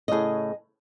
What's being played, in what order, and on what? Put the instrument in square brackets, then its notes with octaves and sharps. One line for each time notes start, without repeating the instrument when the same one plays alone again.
[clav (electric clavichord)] A2 C#3 [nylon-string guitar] G#4 D#5